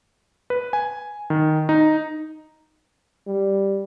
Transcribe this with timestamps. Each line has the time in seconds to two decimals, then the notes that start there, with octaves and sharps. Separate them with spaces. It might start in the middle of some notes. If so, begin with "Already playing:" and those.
0.50 B4
0.73 G#5
1.30 D#3
1.69 D#4
3.27 G3